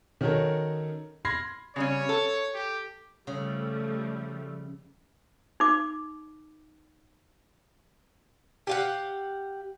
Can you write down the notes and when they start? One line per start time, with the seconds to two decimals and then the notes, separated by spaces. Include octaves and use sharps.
0.21 D#3 C#4 F#4 A4 A#4 C#5
1.25 B5 C6 F6 G#6 A#6 C7
1.76 C#3 G3 C#4 C#5
2.09 A4
2.54 G4
3.27 C#3 F3 G3 A3
5.60 D#4 D6
8.67 G4 F5 F#5